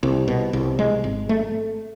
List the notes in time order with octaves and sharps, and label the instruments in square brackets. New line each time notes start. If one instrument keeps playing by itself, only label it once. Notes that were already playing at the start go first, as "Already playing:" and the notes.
[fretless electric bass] C2
B2
C2
G#3
G#1
A3